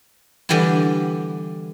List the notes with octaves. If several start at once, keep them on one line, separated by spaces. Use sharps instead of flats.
D3 E3 G3 B3 E4